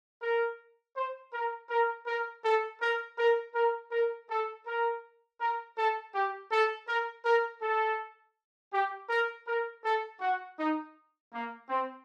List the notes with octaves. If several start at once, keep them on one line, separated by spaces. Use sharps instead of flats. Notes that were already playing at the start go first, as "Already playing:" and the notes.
A#4
C5
A#4
A#4
A#4
A4
A#4
A#4
A#4
A#4
A4
A#4
A#4
A4
G4
A4
A#4
A#4
A4
G4
A#4
A#4
A4
F#4
D#4
A#3
C4